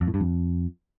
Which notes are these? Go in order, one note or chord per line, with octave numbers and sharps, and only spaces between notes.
F2
A2
G2
F2